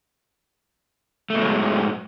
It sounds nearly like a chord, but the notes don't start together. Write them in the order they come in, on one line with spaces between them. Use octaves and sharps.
A3 B2 F#3 G#3 G#2